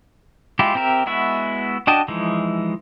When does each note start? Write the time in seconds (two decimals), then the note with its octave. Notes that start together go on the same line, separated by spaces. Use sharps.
0.59 G#3 E4 F4 G4
0.75 C4 G4 A#4 E5
1.06 G#3 B3 E4 F#4 E5
1.87 D4 F#4 D#5 G5 A5
2.08 E3 F3 G#3 D#4 E4